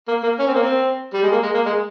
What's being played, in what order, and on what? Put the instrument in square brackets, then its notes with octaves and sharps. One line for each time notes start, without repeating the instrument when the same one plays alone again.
[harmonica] A#3
A#3
C#4
C4
A#3
C4
G3
G#3
A#3
G#3
A#3
G#3